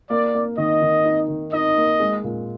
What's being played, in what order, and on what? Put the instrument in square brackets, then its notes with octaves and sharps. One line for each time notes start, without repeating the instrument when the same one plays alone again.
[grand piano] A#3 [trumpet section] D5
[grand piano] A#3
[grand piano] D#3 [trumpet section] D#5
[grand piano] D#3
D#4
D#3
[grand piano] D#4 [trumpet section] D#5
[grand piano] A#3
G#3
A#2